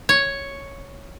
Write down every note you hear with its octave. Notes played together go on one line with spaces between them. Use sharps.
C#5